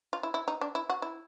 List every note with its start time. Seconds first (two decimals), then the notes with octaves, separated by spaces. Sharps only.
0.13 F4
0.23 E4
0.34 E4
0.48 D#4
0.61 D4
0.75 E4
0.90 F#4
1.02 E4